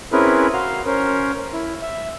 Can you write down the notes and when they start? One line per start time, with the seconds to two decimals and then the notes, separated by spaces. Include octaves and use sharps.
0.12 C4 C#4 E4 G#4 A#4 B4
0.53 F#4 F5 A#5 C6
0.86 C#4 A#4 C5
1.53 E4
1.82 E5